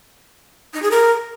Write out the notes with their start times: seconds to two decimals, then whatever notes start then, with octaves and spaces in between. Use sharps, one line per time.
0.74 D#4
0.82 G#4
0.91 A#4